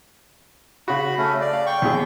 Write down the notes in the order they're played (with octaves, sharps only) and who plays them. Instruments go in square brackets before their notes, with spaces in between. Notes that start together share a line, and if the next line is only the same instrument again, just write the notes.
[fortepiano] C#3 F#4 [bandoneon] B5
[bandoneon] A3 C#4
D5
[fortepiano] F5
[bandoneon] G5 C#6
[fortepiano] D#2 B2 G#4